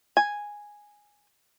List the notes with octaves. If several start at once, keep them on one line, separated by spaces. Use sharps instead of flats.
G#5